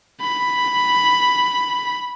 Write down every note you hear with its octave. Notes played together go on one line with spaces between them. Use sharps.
B5